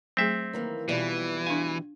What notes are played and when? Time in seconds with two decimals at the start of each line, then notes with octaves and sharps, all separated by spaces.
0.17 F#3 A3 C4 G#4 E5
0.53 D#3 E3 A#3
0.88 F2 B2 E3 G3
1.47 D4 F5 G#5